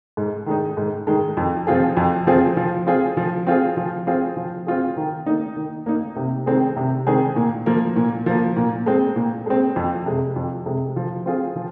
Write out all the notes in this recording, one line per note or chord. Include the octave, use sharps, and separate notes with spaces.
G#2
D#3 G#3 D#4
G#2
D#3 G#3 D#4
F2
F3 C4 F4 G#4
F2
F3 C4 F4 G#4
F3
C4 F4 G#4
F3
C4 F4 G#4
F3
C4 F4 G#4
F3
C4 F4 G#4
D#3
A#3 D#4
D#3
A#3 D#4
C3
D#3 G#3 C4 G#4
C3
D#3 G#3 C4 G#4
A#2
F3 A#3
A#2
F3 A#3
A#2
G#3 C4
A#2
G#3 C4
F2
C3 G#3
F2
C3 G#3
F3
C4 F4 G#4
F3